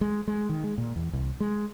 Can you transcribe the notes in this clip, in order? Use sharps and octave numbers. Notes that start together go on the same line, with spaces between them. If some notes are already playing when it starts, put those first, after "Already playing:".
G#3
G#3
D#3
G#3
A#2
E2
C2
G#3